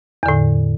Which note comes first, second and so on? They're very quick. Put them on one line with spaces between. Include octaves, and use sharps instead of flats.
E2 D3 A2